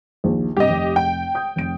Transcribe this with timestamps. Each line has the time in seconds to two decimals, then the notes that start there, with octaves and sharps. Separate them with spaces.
0.24 A#1 D#2
0.57 G2 C3 G4 D#5
0.70 F1
0.96 G5
1.35 D#6 G6
1.56 F1 D7